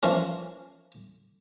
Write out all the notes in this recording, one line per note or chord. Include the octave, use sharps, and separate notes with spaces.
E3 F3 C#4 A#4